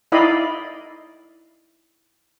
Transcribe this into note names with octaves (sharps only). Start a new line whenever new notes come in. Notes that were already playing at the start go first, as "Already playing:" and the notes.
D#4 E4 D5 D#5 F5 B5